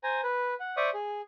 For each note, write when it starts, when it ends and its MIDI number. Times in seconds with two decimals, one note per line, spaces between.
0.03 0.21 72
0.03 0.21 80
0.03 0.21 82
0.24 0.54 71
0.60 0.76 78
0.77 0.90 72
0.77 0.90 74
0.77 0.90 76
0.77 0.90 85
0.77 0.90 87
0.94 1.21 68